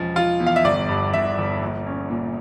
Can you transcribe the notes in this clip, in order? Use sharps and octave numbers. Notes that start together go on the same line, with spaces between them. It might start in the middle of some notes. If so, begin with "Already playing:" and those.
Already playing: E1 F3 C#4
F3 F4
E2
F5
E5
G1 D5
G2
G1 E5
G1
A#1
C#4
A#2